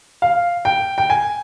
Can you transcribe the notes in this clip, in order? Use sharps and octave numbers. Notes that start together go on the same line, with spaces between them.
F5
G5
G5
G#5